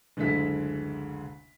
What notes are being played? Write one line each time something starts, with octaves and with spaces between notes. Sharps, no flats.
F#1 D2 G#3 A4 E5 B6